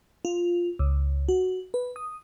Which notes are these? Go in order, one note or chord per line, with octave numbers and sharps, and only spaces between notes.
F4
C#2
F#4
B4
D#6